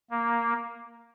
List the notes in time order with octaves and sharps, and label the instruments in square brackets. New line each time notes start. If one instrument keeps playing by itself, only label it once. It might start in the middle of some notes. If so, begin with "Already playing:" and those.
[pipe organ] A#3